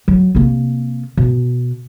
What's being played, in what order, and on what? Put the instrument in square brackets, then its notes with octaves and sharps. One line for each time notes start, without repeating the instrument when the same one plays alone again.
[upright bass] F#3
C3 A#3
B2